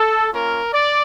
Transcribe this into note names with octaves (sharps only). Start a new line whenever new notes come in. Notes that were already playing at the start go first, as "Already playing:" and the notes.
Already playing: A4
A#3 C#4 F4 A#4
D5